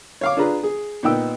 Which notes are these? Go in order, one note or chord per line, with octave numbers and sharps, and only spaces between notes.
C#5 F5 D6
D4 F4 G#4 B4 A#5
G#4
A#2 B3 D#4 G5 E6